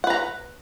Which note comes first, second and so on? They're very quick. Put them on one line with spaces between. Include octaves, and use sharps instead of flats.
F#5 B4 A#5